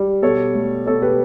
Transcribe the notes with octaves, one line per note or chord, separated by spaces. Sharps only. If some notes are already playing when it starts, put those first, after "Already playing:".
Already playing: G3
B2 A4 C#5
A3
B2 A4 C#5
G4 B4